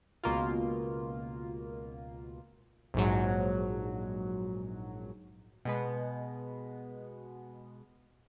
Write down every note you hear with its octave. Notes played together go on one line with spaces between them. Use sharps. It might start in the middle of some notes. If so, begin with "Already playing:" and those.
C#2 B2 A#3 F4
A#1 G#2 F#3
B2 G#3 B3